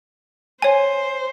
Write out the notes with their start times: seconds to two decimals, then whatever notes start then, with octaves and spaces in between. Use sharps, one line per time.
0.62 C5 C#5 G#5